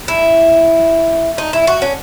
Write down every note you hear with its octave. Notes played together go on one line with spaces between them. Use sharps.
E4
D#4
E4
F#4
C#4